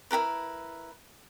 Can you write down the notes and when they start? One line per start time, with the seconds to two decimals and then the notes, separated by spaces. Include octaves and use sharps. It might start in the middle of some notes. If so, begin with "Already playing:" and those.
0.11 E4 G4 A#4 B4